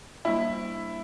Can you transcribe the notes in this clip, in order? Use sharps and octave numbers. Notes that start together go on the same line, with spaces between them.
G3 A#3 D4 E4